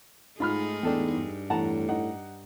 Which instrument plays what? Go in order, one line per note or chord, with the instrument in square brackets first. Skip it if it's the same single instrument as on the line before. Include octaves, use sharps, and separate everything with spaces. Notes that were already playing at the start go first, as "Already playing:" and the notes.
[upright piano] G#2 B5 F6 [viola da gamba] A3 D#4 G#4 [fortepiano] F4
[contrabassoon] E2 [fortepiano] D4 A4 G5
[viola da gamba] G2
[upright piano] E2 [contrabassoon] A2 [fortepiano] F#5 A5 A#5
[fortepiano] D#4 [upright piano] F#5